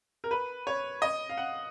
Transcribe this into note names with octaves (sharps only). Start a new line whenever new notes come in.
A#4
B4
C#5
D#5
F5
F#5